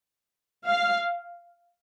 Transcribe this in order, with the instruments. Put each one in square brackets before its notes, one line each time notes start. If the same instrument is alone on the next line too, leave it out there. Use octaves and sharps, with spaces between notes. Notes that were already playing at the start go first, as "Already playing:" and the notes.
[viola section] F5